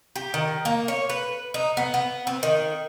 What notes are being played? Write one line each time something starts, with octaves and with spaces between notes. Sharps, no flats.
G4
D#3
A#3
C#5
B4
D#4
B3
B3
C4
D#3